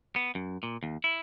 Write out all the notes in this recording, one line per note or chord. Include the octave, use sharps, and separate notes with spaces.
B3
F#2
A#2
D#2
E4